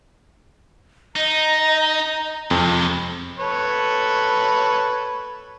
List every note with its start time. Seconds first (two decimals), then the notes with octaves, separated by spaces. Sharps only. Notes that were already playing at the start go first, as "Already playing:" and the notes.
1.16 D#4 D#5 A#5
2.51 F2 C3 G#3
3.39 A4 B4 C#5